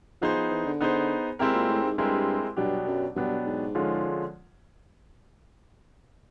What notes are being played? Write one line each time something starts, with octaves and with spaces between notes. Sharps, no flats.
F3 B3 D#4 G#4 C5
F3
E3
D3
B3 D#4 G#4 C5
C3 G#3 C4 E4 G4 A#4
A#2
A2
G#2
G2 G#3 C4 E4 G4 A#4
G2 B2 F#3 B3 D4 G4
F#2
G2 B2 F#3 B3 D4 G4
G#2
D3 F3 G#3 C#4 F4